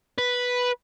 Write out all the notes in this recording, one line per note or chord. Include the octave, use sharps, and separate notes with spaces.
B4